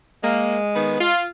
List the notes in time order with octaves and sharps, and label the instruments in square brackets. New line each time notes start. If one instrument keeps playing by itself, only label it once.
[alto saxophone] G#3 [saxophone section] A#3
[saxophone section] D#3 B3
F4